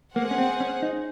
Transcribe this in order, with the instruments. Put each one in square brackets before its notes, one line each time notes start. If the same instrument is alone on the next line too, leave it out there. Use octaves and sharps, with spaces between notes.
[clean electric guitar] A#3 [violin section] G#4 C5 F#5
[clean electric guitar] C#4
C4
C#4
D#4